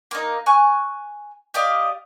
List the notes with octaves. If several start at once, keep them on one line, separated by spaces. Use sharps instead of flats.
A#3 D#4
G#5 C#6 F#6
G4 D5 D#5 F5